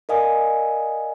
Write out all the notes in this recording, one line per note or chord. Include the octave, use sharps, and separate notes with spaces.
A#4 D5 D#5 F5 G#5 D#6